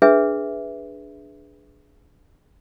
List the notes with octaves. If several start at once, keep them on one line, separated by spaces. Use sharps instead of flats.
D4 G#4 B4 E5